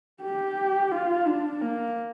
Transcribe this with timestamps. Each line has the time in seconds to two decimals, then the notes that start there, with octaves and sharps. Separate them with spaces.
0.23 G4
0.92 F4
1.27 D4
1.61 A#3